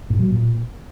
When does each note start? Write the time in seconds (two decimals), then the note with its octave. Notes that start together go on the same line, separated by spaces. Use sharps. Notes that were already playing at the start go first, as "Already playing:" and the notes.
0.10 A2
0.19 F#3
0.28 A#2